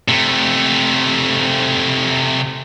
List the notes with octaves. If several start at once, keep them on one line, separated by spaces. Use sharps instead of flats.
C3 A3